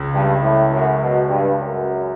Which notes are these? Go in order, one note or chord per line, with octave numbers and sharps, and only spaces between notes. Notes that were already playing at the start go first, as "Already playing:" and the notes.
Already playing: C#2 C#3
G2
A2
F#2
B2
G2
F#2